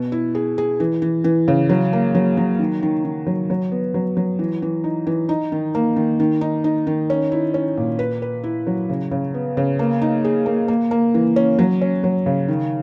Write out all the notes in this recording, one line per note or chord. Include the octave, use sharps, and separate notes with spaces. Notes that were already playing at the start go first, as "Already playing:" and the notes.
Already playing: B2
E4
G#4
G#4
E3
E3
E3
C#3
F#3
A#3
F#3
F#3
D#3
D#3
D#3
F#3
F#3
B3
F#3
F#3
E3
E3
D#4
E3
D#4
D#3
A#3
D#3
D#3
D#4
D#4
D#3
C#4
E4
C#4
A#2
B4
B4
E4
F#3
C#3
C#3
B3
C#3
A#3
D#4
G#4
A#3
A#3
A#3
E3
C#4
F#3
C#4
F#3
C#3
D#3